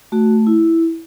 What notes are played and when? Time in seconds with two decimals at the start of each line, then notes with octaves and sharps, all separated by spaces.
0.12 A3 F#4
0.47 E4